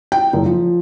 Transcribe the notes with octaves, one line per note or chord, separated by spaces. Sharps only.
G5
F#1
F3